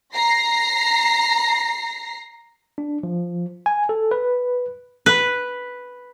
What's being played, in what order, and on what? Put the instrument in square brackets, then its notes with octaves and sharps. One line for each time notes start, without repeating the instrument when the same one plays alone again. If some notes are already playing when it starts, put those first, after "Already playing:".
[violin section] A#5 A#6 C7
[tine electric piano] D4
F3
G#5
A4
B4
[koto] B4